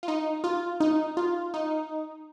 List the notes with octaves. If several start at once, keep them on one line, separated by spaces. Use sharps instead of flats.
F4
D#4
F4
D#4
F4
D#4